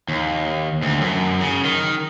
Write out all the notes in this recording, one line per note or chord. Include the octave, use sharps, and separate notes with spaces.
D#2
D2
F#2
C#3
D#3